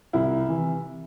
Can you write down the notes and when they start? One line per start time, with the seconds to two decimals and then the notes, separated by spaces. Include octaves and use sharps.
0.13 C2 E4
0.48 C3 E3